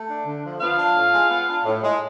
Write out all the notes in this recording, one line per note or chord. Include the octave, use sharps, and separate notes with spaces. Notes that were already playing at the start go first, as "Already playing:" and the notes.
Already playing: A3
D4
D3
F3
B3 F4 F5
D4
A2
G#3
B3
D4
A2
G#3